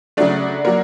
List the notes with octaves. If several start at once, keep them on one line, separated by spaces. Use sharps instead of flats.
C#3 F#3 A3 D4
F#3 A#3